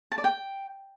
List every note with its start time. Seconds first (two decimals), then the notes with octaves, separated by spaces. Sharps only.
0.12 A5
0.18 D5
0.24 G5